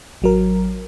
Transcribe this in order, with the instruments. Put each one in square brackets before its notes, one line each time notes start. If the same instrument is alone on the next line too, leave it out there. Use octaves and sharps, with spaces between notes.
[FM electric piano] A1 F#3 A#4